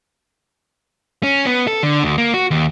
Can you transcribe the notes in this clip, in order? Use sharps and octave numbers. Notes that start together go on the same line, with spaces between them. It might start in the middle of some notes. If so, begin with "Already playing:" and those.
C#4
B3
A4
D3
D2
A#3
F#4
D#2